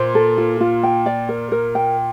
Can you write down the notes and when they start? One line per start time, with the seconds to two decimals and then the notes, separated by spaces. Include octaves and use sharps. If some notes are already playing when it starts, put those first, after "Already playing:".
Already playing: A#2 C5
0.15 A4
0.38 F4
0.61 F4
0.83 G5
1.06 D5
1.29 A#4
1.52 A#4
1.75 G5